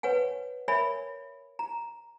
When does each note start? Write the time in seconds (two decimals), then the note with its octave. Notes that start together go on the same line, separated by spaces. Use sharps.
0.03 B4 C#5 F#5 G#5
0.68 A#4 C#5 D5 E5 G#5 B5
1.59 A#5